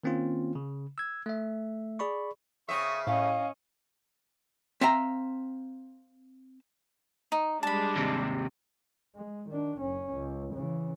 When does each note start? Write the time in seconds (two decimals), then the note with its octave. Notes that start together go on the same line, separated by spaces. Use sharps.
0.04 D#3 A#3 C4 C#4 F4
0.55 C#3
0.98 E6 G#6
1.26 A3 E5
1.99 G#4 D5 B5 C#6
2.69 C#3 C4 E5 C#6 D#6
3.07 A2 C#4 D#5 F5
4.81 C4 E5 F5 G5 A#5
7.32 D#4
7.63 G3 G#3 D4 A5 B5
7.96 D#2 C3
9.16 G#3
9.49 D#3 D4
9.79 F#1 C#4
10.13 C#2
10.54 C#3 E3